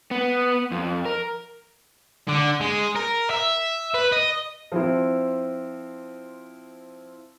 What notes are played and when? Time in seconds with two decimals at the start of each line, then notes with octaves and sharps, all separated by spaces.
0.11 B3
0.71 F2
1.05 A#4
2.28 D3
2.61 G#3
2.96 A#4
3.31 E5
3.94 B4
4.12 D#5
4.72 F3 C4 E4